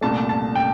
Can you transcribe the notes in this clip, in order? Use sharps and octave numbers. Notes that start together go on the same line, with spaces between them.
C2 A#2 A3 A5
A5
G5